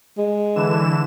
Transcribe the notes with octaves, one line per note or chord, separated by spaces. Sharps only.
G#3
D3 E3 E7